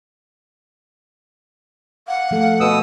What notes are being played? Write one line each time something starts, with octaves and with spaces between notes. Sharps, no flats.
F5 F#5
F3 A3 A4
B2 B4 D#6 E6